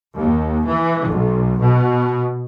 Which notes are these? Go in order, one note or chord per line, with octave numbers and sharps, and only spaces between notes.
D#2
E3
B1
B2